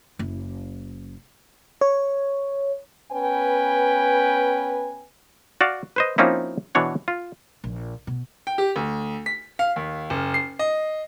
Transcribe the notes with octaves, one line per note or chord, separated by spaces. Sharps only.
F#1 E4
C#5
B3 C#4 B4 G5 G#5
F#4 D5 F5
B4 C5 D#5
F3 A#3 C4 C#4 D#4 E4
B2 E3 D4 C#5 F#5
F4
A#1
B2
G5
G4
D2
B6
F5
D#2
F#1
C7
D#5